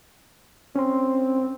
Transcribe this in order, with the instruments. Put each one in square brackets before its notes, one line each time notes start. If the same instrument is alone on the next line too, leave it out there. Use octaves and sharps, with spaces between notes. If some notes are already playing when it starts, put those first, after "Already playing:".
[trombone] C4 [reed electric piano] C#4 C6